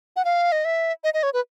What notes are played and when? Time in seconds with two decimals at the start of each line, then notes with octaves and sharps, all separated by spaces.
0.16 F#5
0.25 F5
0.52 D#5
0.65 E5
1.04 D#5
1.14 D#5
1.23 C#5
1.34 B4